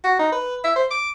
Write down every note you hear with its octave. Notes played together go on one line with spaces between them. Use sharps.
F#4
D#4
B4
E5
C5
D6